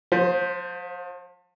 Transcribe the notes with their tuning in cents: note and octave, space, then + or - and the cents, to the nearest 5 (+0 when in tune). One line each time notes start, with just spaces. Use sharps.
F3 +40 C5 +0